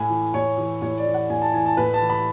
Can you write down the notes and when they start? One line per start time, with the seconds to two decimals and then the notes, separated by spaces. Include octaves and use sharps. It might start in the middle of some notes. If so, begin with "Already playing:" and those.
Already playing: A2 G#5
0.10 E3
0.34 A2 C#5
0.58 E3
0.82 A2 C#5
0.98 D5
1.06 E3
1.14 F#5
1.30 A2 G#5
1.42 A5
1.54 E3 G#5
1.66 A5
1.77 A2 B4
1.94 A5
2.01 E3
2.10 B5